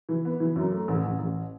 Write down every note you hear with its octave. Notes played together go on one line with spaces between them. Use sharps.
E3
B3
E3
F#2
A3
A1
A1
A1